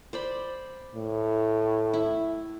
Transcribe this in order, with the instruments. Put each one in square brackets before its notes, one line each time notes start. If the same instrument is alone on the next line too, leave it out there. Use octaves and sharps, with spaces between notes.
[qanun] C5 D5 B5
[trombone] A2
[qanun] E4